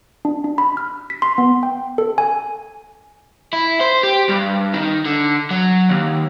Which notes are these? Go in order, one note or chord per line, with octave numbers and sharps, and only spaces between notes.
D4
D4
B5
F6
B6
C6
B3
G5
A4
G#5
E4
C5
G4
G2
D#3
D3
F#3
D#2